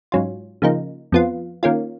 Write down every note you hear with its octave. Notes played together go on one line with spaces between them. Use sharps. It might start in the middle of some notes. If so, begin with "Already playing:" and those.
G#2 F#3 C#4 F4
C#3 F3 A#3 D#4
F2 F3 B3 F4
D#3 A#3 C#4 F4